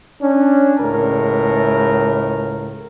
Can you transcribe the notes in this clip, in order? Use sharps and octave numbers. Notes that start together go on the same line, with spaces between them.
C#4 D4
C#2 A2 A#4